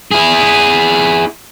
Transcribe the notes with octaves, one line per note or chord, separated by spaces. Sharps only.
E4 G#4